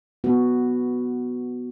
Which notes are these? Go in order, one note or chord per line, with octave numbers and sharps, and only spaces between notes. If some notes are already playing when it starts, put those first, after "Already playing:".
B3 F#4